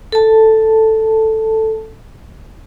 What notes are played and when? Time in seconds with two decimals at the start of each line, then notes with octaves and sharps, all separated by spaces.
0.12 A4 A5